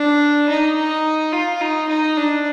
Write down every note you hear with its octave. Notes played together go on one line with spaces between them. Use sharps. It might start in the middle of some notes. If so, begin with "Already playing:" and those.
Already playing: D4
D#4
D#4
F4
D#4
D#4
D4